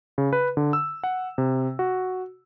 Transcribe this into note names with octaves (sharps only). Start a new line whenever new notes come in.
C#3
B4
D3
E6
F#5
C3
F#4